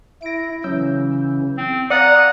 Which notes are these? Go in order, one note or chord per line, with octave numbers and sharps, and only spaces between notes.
E4 A#6 D7
C#3 E3 F#3 E6 G6
C4
D5 F5 F#5 A#5 D#6